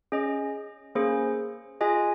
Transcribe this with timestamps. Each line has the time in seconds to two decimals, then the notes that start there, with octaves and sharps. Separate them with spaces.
0.12 C#4 G#4 D#5
0.95 A#3 C#4 G#4 C5
1.81 F4 G#4 D#5 G#5